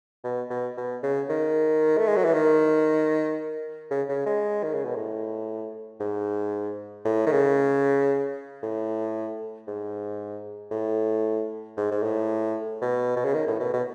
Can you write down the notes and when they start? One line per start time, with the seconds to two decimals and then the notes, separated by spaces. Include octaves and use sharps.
0.24 B2
0.50 B2
0.77 B2
1.03 C#3
1.29 D#3
1.98 A3
2.07 G#3
2.16 F#3
2.24 E3
2.34 D#3
3.90 C#3
4.09 C#3
4.26 G#3
4.64 D#3
4.73 C#3
4.85 B2
4.95 A2
6.00 G#2
7.05 A2
7.26 D#3
7.32 C#3
8.63 A2
9.67 G#2
10.71 A2
11.77 G#2
11.91 G#2
12.03 A2
12.81 B2
13.16 B2
13.25 C#3
13.34 D#3
13.47 A2
13.60 B2
13.74 B2